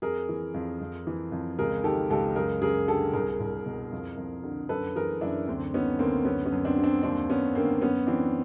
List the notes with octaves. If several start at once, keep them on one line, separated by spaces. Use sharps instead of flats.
F2 G#4 A#4
E3
F2
F2
E3
F2
C#2 G#4 A#4
D#3 G4 A4
C#2 G4 A4
F#2 G#4 A#4
F#2 G#4 A#4
D3 G4 A4
C2 G#4 A#4
C2
B2
F2
F2
D3
F#2 A4 B4
E3 G#4 A#4
F#2 D4 E4
D2 C4 D4
D#3 B3 C#4
D2 A#3 C4
F#2 B3 C#4
B3 C#4
F#2
C4 D4
D3
C4 D4
D#2 C4 D4
D#2 B3 C#4
D3 A#3 C4
F#2 B3 C#4
E3 C4 D4